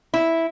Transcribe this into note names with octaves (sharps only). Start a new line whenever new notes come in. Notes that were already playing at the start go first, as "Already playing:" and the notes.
E4